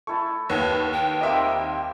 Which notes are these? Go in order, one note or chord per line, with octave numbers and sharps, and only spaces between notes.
A3 E4 A5 C#6
D#2 B4 C#5 F#5
G5
G3 A#3 C4 D#5 E5